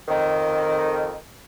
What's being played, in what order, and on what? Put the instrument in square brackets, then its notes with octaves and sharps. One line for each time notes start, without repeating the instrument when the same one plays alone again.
[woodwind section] F2 D#3